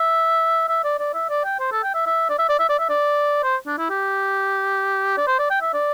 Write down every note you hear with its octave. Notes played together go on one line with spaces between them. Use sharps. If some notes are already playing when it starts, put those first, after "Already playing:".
Already playing: E5
E5
D5
D5
E5
D5
G5
C5
A4
G5
E5
E5
D5
E5
D5
E5
D5
E5
D5
C5
D4
E4
G4
D5
C5
D5
G5
E5
D5